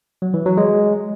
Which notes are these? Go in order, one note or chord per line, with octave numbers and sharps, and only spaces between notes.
F#3
E3
F#3
G#3